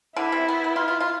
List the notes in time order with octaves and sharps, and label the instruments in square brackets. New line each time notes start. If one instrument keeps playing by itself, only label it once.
[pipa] D3 [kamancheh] E4
[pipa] C3
B3
B3
F4
F4
F4